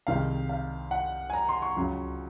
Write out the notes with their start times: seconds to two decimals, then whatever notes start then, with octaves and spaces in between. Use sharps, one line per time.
0.07 C2 C3 D#3 G#3 C4 F5
0.49 F5
0.91 F#5
1.30 G#5
1.33 A#5
1.49 C6
1.62 C#6
1.77 C#2 C#3 F#3